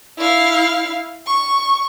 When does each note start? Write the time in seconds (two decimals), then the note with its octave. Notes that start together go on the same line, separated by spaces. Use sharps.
0.18 E4 F5
1.27 C#6